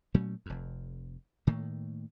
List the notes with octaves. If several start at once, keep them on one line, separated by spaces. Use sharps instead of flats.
A#2 F#3 A3 C#4
F1 F2
A2 D#3 A3 A#3